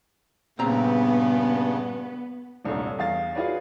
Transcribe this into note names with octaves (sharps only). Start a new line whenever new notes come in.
G2 A#2 C#3 B3 C4 A#5
D#1 C2 G2 A3 C#5
E2 F5 A6
F4 F#4 G#4 B4 C#5 D5